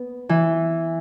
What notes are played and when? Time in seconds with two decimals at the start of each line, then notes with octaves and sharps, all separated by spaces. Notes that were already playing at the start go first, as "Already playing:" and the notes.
Already playing: B3
0.29 E3